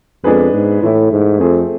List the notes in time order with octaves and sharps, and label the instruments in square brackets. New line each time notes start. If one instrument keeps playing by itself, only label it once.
[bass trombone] F2 [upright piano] G#3 B3 D4 G#4 B4
[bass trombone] G#2
[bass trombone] A2 [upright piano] E3 A3 E4
[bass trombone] G#2
[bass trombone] F2 [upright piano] F3 A3 C4 G#4